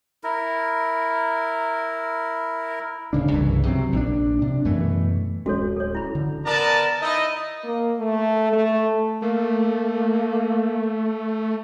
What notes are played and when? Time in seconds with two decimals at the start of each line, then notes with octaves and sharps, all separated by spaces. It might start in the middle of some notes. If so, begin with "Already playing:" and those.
0.24 E4 A#4
3.13 D1 C#3 D4
3.31 C2 G2 C#3 E3
3.66 C3 F#3 C4
3.92 A#1 C4 D4
4.39 C3 D4
4.65 F#2 B2 E3 A3
5.46 D1 G#3 C#4 F#4 A4 C#5
5.77 A4 C#5
5.95 E4 B5
6.15 D3
6.45 B3 A#4 D5 A5
7.01 D#4 E4 D#5
7.64 A#3
7.99 A3
8.53 A3
9.22 A3 A#3